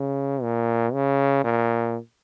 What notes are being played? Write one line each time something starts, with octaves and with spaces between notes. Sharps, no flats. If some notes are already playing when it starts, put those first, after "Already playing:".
Already playing: C#3
A#2
C#3
A#2